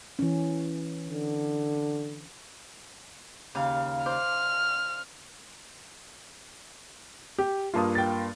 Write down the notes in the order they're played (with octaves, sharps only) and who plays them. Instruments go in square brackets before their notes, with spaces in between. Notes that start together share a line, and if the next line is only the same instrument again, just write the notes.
[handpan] E3 C#4
[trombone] D3
[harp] D#2 C#3 F5
[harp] C5 D5 [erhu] F6
[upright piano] G4
[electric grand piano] G2 A#3 F4 [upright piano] F5 A5 D#6
[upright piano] G5 A6